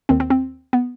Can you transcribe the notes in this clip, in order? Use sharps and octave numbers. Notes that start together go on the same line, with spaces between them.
D#2 D#3 C4
C4
C4
B3